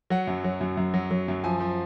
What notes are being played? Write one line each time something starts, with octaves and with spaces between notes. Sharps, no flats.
F#3 F#5
F#2
F#3
F#2
F#2
F#3
F#3
F#2
F3 G#5
F3